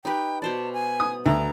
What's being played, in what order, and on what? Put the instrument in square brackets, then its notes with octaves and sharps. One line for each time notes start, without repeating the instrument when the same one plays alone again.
[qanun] D#4 G4 B4 [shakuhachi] G5
[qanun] B2 C5 D5 [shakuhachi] A5
[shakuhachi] G#5
[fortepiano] D#6
[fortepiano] D2 [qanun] B3 [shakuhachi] A#5